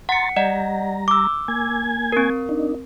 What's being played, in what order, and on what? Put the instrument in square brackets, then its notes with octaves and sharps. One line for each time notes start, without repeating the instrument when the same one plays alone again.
[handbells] F#5 C#7 [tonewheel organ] A#5 C6 A6
[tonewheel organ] G3 A#5 [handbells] D5 D#5 F#5
[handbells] D6 E6
[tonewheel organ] A#3 G#5 G#6
[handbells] C4 A#4
[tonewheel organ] D4 D#4